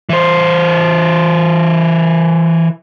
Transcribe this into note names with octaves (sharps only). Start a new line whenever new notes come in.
E3 C5